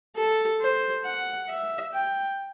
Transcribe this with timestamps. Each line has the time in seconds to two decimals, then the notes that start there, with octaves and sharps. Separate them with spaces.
0.17 A4
0.61 C5
1.05 F#5
1.49 E5
1.94 G5